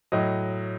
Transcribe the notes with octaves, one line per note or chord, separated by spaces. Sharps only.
A2 F#3 D#5